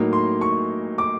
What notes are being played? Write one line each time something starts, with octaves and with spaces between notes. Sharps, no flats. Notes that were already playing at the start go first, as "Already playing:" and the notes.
Already playing: A2 F#3 A#3 D#4
C6
C#6
D6